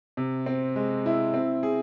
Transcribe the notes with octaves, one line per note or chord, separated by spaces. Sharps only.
C3
C4
G#3
E4
C4
G#4